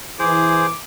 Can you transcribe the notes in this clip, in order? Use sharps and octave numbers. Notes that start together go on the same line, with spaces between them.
E3 G#4 C5 D6